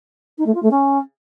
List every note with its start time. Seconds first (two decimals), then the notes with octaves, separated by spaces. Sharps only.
0.38 D#4
0.46 A3
0.55 F4
0.63 A3
0.71 C#4